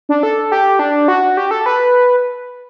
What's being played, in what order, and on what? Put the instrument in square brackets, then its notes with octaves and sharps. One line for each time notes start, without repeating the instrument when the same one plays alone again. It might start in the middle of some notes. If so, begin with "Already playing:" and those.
[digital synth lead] D4
A4
G4
D4
F#4
G4
A4
B4